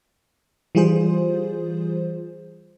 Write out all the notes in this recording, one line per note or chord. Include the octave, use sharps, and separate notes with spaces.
E3 G3 F4 G#4 C5